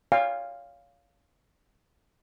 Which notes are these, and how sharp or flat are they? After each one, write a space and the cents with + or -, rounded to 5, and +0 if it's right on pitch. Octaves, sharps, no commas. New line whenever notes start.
C#5 +35 F5 +0 G#5 -45